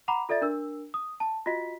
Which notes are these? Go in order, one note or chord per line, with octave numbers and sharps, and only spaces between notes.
F#5 A#5 B5 D6 F7
F4 A4 D5 E5 A6
D4 A#4 E6
D#6
A5
F4 F#4 D#5 B6